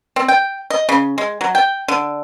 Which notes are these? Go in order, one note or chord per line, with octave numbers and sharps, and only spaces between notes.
C4
G5
D#5
C#3
G#3
F#3
G5
D3